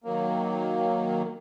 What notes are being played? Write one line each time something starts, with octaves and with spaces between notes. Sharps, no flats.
D#3 F#3 A#3